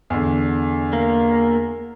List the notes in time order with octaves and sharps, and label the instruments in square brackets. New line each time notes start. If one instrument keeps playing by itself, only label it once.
[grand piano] E2 D3
[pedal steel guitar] A#3